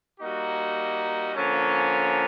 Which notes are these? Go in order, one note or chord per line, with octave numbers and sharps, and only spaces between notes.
G3 A#3 D#4 F#4
D3 F3 A#3 C#4